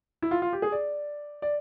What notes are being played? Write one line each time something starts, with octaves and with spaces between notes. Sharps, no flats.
E4
F4
F4
G4
G#4
D5
D5